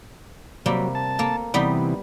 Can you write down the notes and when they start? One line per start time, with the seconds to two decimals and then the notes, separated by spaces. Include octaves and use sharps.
0.66 C3 F#3 G3 A#3
0.95 A5
1.19 A#3 A4
1.54 C3 E3 G3 B3 D#4